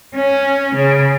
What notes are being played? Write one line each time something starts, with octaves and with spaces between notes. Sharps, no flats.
C#4
C#3